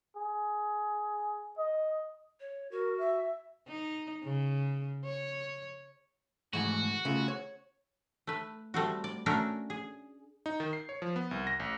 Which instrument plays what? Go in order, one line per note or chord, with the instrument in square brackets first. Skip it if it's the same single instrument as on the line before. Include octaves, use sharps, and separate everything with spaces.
[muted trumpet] G#4
D#5
[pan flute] C#5
[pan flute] F#4 [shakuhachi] A#4
[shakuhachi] E5
[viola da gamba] D#4
C#3
C#5
[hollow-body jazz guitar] G#2 E3 A3 [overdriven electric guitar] F#4
[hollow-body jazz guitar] C#3 A3 F4
C#5
[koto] A3 B4
G3 A3 C4 F#4
D5
A3 C#4 D4 F#4 A#4
G#4
[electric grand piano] D#4
D#3
C7
C#5
F3
B3
C2
A#6
A1